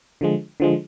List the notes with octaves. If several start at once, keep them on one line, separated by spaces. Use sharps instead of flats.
D3 F3 G#3
D3 F3 G#3